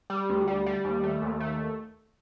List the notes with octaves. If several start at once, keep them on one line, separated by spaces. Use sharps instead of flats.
G3
D2
G3
G3
D#2
A3
D#2
A3